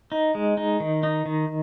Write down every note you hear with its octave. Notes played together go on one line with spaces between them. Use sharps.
D#4
G#3
D#4
D#3
D#4
D#3